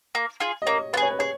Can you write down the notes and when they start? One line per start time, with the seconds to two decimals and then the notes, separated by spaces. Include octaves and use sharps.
0.15 A#3
0.40 F4 G#4
0.62 D#5
0.66 A#3 C#5
0.93 F4 B4
0.97 G#4 C#5
1.11 B4
1.19 G#4 C#5